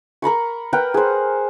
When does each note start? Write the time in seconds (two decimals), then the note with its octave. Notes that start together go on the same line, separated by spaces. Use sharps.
0.22 A#4 A#5 B5 C#6
0.73 A#4 B4 F#5 G5
0.94 G#4 C5